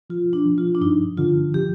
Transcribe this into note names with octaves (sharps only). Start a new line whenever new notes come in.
F3 F4
D4
F3
F4
D4
G2 D#4
D3 F4
F3 G4